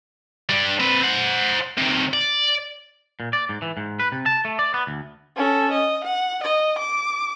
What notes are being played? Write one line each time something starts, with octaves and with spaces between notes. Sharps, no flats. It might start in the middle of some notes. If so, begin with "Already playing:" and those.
G3 D4
C4 B4
C5 F#5
C3 D#3
D5
A#2
D5
G#2
E3
G#2
B4
C3
A5
A3
D5
B3
D2
C#4 A4
D#5
F#5
D#5
D6